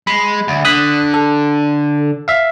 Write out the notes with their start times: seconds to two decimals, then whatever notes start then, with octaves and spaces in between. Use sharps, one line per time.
0.07 G#3 B5
0.48 D2
0.65 D3 D#6 F#6 B6
1.14 A4
2.28 E5 F5